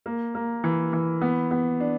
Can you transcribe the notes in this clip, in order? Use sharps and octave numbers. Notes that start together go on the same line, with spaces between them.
A#3
A#3
E3
E3
B3
B3
D4